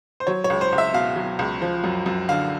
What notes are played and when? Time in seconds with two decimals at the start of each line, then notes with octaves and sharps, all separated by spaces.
0.20 C5
0.27 F#3 C#5
0.44 C#5
0.50 C#2
0.61 C5
0.72 C#2
0.78 E5
0.94 B2 F5
1.16 F#3
1.39 C#2
1.62 F3
1.84 F#2
2.06 F#2
2.29 D3 F5